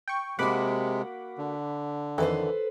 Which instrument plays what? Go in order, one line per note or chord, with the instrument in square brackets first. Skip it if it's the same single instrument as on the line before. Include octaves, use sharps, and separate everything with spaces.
[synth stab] G5 C#6
[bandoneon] C3 G#3 [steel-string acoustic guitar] A#3 F#4 [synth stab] F#5 B5 D6
[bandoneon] D3
[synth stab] F2 D#3 E3 [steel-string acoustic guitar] A4 B4 C5